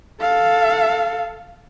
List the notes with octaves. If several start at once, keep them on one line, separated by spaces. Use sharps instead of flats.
A4 F5